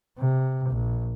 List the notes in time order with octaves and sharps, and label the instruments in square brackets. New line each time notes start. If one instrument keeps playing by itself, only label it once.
[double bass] C3
A#1